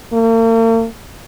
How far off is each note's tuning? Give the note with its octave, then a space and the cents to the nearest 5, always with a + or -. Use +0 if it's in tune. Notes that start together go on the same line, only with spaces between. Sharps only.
A#3 -45